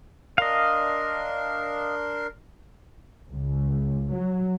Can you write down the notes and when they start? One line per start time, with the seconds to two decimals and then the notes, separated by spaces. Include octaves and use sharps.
0.38 D4 A#4 D#5 F5 C6
3.31 C#2
4.12 F#3